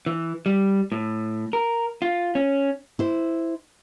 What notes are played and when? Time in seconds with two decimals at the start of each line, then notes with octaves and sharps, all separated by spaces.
0.06 E3
0.46 G3
0.92 A2
1.53 A#4
2.02 F4
2.35 C#4
2.99 E4 C5